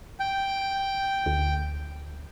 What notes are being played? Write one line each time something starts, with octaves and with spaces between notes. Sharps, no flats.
G5
D2